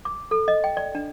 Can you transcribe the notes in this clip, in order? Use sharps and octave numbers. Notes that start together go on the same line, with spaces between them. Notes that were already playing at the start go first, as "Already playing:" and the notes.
D6
A4
D#5
G5
D5
D4